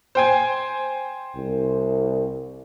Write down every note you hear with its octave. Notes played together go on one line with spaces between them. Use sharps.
C5 G5 G#5
C2